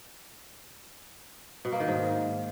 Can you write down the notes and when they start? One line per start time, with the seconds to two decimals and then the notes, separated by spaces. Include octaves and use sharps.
1.65 B2
1.72 A#3
1.80 D#3
1.88 G#2